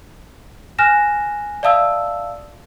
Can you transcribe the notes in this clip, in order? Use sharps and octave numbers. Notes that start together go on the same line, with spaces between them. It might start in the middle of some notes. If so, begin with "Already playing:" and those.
G#5 F6 F#6 A#6 E7
D5 E5 F5 A5 D#6 E6